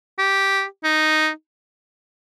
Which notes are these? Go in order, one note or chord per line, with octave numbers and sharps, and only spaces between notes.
G4
D#4